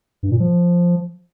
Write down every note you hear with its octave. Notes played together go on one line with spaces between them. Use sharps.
G2
A#2
F3